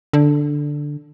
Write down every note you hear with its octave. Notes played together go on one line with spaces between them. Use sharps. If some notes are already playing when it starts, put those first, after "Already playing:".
D3